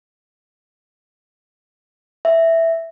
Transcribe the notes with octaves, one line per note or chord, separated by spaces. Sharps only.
E5